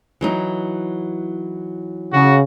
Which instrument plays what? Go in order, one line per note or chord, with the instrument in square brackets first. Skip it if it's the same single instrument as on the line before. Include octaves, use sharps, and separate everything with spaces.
[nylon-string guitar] E3 F#3 D#4
[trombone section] C#3 [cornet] F#4